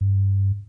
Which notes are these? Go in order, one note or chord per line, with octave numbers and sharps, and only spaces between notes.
G2